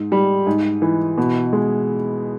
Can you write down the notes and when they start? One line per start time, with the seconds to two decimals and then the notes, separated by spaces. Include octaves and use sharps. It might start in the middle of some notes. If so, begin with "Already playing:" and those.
Already playing: G#2
0.12 G3
0.47 G#2
0.82 E3
1.18 B2
1.53 G#3